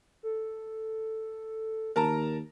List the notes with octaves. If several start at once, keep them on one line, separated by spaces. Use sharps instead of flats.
A4
D#2 A#4 A5 A#5